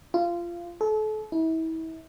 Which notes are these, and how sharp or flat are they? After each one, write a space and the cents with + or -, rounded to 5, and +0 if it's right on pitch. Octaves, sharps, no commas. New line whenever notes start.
F4 -20
A4 -35
E4 -35